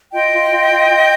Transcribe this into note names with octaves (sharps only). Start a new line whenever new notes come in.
F4 D#5 G5
F4
F4
F4
F4